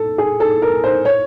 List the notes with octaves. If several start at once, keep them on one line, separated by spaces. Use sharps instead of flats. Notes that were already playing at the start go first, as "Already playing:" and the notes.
Already playing: A4
G#4
A4
A#4
C5
C#5